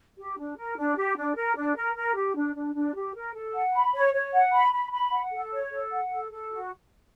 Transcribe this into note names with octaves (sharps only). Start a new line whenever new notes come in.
G4
D4
A#4
D4
G4
D4
A#4
D4
A#4
A#4
G4
D4
D4
D4
G4
A#4
A4
F#5
B5
C#5
C#5
F#5
B5
B5
B5
F#5
A4
C#5
A4
F#5
A4
A4
F#4